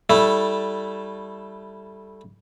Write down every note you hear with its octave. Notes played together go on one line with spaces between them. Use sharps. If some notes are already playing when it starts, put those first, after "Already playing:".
G3 A3 E4